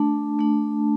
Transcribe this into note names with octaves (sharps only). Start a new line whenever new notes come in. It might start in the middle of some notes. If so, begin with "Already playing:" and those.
Already playing: A3 D4 A5
A3 D4